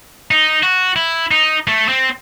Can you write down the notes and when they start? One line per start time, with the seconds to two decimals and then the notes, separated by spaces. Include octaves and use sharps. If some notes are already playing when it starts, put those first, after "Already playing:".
0.31 D#4
0.63 F#4
0.96 E4
1.31 D#4
1.68 A3
1.89 C4